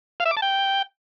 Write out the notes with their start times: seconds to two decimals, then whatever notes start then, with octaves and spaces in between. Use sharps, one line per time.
0.20 F5
0.25 E5
0.31 D6
0.37 A5
0.42 G5